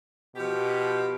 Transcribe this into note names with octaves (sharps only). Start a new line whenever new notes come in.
B2 F3 G4